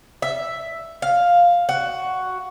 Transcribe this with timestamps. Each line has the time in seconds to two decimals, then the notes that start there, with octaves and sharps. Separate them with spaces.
0.22 E5
1.02 F5
1.69 F#4